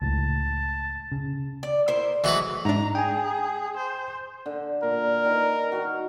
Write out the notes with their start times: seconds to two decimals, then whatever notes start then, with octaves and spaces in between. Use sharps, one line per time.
0.02 C#2 A2 A5
1.12 C#3
1.63 D5
1.88 E4 A#4 C5
2.24 E3 F#3 G#3 A3 F#4 B4
2.65 G#2 D4 A#5
2.95 G#4 G5 G#5
3.77 C5
4.46 D3
4.83 A#2 A#4
5.25 D#3 B4
5.72 D#3 F#4